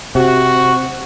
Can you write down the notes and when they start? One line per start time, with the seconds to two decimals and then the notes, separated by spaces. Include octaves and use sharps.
0.15 C3 F#4